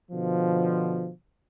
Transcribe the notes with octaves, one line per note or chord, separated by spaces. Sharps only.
B2 D3 F3